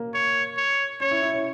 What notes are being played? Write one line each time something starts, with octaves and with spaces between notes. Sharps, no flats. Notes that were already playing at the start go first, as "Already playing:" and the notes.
Already playing: A#3
C#5
C#5
C#4 C#5
E4
E4
C#4